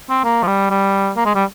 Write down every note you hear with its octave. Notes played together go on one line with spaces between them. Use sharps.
C4
A#3
F3
G3
G3
A#3
G#3
G3